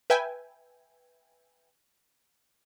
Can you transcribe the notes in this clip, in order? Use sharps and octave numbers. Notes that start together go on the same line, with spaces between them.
B4 E5 G5 G#5